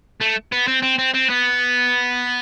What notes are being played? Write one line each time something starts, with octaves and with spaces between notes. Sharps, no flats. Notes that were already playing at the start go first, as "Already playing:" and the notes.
A3
B3
C4
C4
C4
C4
B3